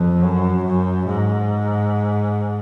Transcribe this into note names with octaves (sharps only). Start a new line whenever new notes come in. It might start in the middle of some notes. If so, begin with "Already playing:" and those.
Already playing: F2
F#2
F#2
G#2